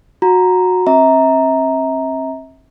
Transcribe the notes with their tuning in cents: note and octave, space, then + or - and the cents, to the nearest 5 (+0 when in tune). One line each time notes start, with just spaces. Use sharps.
F#4 -20 A#5 +0
C4 +40 E5 -35 A#5 +0